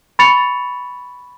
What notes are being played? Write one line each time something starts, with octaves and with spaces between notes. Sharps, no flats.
B5 C#6 A6 C#7 F7